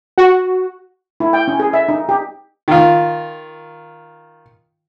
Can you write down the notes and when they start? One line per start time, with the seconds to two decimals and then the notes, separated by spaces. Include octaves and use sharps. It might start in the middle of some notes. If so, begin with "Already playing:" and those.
0.18 F#4
1.20 E4
1.33 G5
1.48 C#4
1.60 G#4
1.73 E5
1.89 D#4
2.09 G4
2.68 D#3 F4